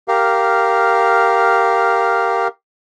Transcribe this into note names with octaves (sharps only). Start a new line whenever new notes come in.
G4 A#4 F5